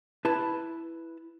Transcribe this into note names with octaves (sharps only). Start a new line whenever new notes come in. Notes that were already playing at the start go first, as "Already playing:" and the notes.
E4 B4 A5 B5